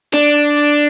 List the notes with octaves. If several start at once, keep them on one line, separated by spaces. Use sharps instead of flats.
D4